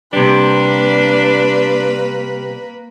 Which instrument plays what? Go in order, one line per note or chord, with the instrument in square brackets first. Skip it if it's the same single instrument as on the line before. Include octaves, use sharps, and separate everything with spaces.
[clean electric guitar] C3 G3 [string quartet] A#3 B4 [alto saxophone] D4